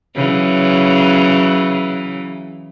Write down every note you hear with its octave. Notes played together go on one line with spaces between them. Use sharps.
C#3 E3 F#3